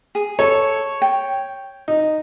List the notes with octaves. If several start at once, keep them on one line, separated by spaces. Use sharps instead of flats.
G#4
A4 C#5
G5
D#4